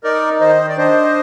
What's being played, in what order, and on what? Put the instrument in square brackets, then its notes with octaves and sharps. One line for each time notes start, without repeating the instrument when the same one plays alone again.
[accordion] D#4 A#4 D5
D#3 C5 D#5
D5
D4 C5 D#5